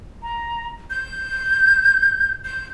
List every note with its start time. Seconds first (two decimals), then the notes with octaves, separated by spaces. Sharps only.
0.23 A#5
0.90 G6
2.45 G6